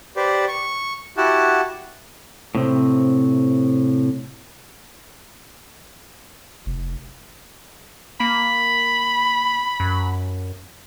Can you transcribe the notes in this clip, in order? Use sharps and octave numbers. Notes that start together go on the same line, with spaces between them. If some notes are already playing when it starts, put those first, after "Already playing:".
G4 B4 C5 D5
C#6
E4 F#4 G4 F#5 A5
A2 C3 C4
F1
A#3 B5
F#2